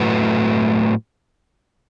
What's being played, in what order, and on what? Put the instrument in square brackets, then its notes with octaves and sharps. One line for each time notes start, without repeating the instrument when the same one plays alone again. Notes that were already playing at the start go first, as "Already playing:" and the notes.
Already playing: [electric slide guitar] A2 F#3 A3 F#4 B4